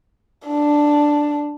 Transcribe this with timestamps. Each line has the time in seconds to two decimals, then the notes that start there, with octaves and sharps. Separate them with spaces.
0.48 D4